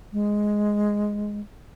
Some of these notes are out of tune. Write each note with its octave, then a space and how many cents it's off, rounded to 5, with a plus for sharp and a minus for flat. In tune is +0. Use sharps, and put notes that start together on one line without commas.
G#3 +0